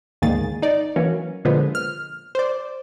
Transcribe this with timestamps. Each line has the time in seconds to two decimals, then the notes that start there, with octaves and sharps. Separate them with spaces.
0.22 D2 G#2 D#3 A#3 G#4 A6
0.62 D#4 D5
0.96 E3 F#3 A#3 C#4
1.45 A#2 D3 F3 G#3 B3
1.75 F6
2.35 C5 D5